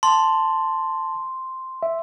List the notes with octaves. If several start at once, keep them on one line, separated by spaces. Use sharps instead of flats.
A5 C6
E5